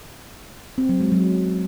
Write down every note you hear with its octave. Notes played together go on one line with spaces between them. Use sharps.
C4
F#3
G#3
F#3